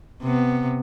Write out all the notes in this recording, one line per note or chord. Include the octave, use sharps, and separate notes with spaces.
C3 B3